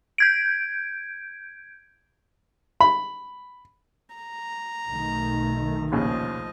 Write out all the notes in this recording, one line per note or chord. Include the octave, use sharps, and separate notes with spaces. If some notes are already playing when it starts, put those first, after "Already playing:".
G6 G#6 D7
B5
A#5
B1 D#3 A3
A#1 D#2 C#3 F3 D#5